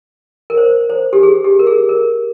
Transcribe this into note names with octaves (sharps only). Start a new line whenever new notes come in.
A#4
C5
C5
G4
G#4
G4
A#4
G#4
A#4